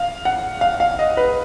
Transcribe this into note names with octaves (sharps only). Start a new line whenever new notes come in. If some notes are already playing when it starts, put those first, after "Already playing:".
Already playing: F5
F#5
F5
F5
D#5
B4